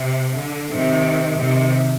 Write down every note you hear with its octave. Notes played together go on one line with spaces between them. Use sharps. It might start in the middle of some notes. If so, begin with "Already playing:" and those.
Already playing: C3
D3
C3 D#3
C3 D#3